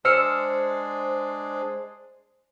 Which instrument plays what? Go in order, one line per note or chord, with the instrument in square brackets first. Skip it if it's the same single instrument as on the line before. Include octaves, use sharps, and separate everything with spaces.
[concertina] G#3 D4 [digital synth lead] C5 [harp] E6 F6 C#7